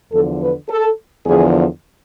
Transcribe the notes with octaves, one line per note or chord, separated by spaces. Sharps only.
E2 D3 F3 A4
B4
A4
E2 D3 F3 G#4